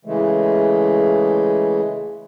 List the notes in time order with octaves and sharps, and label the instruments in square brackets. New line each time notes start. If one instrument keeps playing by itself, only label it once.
[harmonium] C#3 E3 G#3 A3